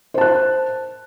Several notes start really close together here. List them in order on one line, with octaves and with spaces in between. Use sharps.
C5 A5 F#6